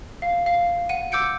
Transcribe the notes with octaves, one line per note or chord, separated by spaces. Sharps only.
F5
F5
F#5 D#7
D6 E6 G6 C#7 D7